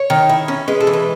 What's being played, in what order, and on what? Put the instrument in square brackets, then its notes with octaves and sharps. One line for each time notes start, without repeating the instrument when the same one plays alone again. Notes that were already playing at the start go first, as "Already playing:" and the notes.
Already playing: [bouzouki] C#5
D#3
E4
C#4
G#3 B4
A4
E3
B4